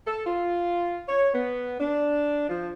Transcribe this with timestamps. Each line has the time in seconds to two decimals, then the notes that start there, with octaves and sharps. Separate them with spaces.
0.06 A4
0.26 F4
1.08 C#5
1.33 B3
1.80 D4
2.49 F3